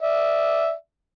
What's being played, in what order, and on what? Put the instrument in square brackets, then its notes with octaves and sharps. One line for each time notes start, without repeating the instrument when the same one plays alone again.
[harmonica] D5 E5